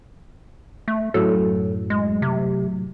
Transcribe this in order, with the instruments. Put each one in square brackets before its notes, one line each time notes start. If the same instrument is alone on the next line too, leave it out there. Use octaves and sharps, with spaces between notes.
[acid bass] A3
[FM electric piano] F#2 A2 F#3 [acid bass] A4
[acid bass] G#3
C3